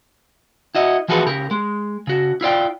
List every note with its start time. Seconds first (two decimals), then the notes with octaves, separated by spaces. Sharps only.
0.75 E4 F#4 D#5
1.08 E3 F3 F#4 G#4 A4 B4
1.27 C#3 G4 A#4
1.51 G#3
2.07 C#3 F#4
2.41 E4 F4 D5 G5